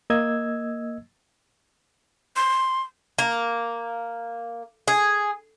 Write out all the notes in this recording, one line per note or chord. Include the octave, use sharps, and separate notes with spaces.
A#3 D#5 E6 G#6
C6
A#3
G#4